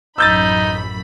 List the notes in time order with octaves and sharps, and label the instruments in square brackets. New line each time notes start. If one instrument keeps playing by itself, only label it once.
[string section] A1 F#2 B5 [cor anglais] D#4 [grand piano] E6 G6 A6